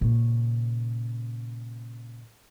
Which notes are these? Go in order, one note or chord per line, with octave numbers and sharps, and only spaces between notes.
A#2 C#3